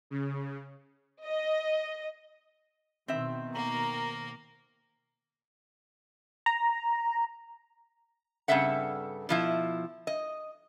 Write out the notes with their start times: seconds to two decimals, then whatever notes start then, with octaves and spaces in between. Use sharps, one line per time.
0.10 C#3
1.26 D#5
3.08 B2 D#3 C4 E5
3.54 A#3 A#4 A#5
6.46 A#5
8.48 G2 C#3 C4 A4 E5 F#5
9.29 B2 F3 E4
10.07 D#5